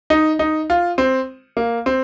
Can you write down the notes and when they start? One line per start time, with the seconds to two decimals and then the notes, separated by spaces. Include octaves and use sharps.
0.10 D#4
0.39 D#4
0.70 F4
0.98 C4
1.57 A#3
1.86 C4